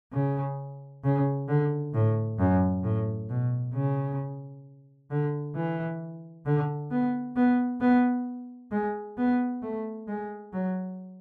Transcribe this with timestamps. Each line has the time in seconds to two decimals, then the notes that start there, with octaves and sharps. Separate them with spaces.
0.12 C#3
1.04 C#3
1.48 D3
1.94 A2
2.39 F#2
2.84 A2
3.29 B2
3.74 C#3
5.11 D3
5.55 E3
6.46 D3
6.91 B3
7.36 B3
7.81 B3
8.71 G#3
9.18 B3
9.62 A3
10.08 G#3
10.53 F#3